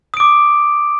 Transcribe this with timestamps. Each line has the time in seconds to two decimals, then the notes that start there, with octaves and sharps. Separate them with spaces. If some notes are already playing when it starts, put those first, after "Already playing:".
0.14 D#6
0.17 D7
0.20 D6